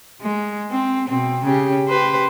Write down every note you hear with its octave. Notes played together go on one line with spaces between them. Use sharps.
G#3
C4
B2 C4
C#3 C#4 G4
G4 B4 C5